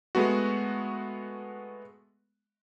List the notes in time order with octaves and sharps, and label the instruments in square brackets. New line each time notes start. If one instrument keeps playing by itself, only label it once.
[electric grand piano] G#3 A3 B3 F#4